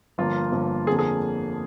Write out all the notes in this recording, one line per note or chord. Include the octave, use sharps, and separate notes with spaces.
G1 G2 F3 A#3 F4
G1 G2 F3 A#3
F2 D3 F3 A#3 G#4
G#4